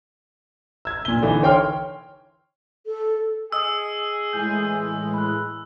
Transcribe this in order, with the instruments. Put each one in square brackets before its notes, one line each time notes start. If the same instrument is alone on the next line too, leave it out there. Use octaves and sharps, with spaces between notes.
[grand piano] E6 G#6
A#2 G7
D3 E3 D#4
C#5 G5 C6 F6
[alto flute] A4
[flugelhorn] G#4 [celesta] D#5 D#6 [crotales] E6
[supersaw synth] A2 E3 G#3 [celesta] G#5 G6
[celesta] B5 F#6